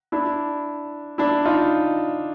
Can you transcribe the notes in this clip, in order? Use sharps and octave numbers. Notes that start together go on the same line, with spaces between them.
D4 E4
D4 E4
D#4 F4